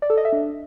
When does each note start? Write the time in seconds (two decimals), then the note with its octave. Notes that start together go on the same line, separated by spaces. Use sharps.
0.02 D5
0.10 A4
0.17 D#5
0.25 E5
0.32 D4